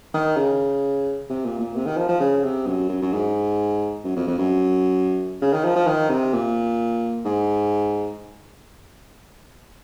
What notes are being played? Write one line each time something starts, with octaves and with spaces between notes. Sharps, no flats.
D#3
C#3
C3
A#2
A#2
C3
D#3
F3
F3
C#3
C3
F#2
F#2
F#2
G#2
F#2
F2
F2
F#2
C#3
D#3
F3
F3
D#3
C3
A#2
G#2